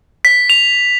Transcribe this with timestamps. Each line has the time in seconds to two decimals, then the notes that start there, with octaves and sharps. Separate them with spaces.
0.25 B6
0.50 F7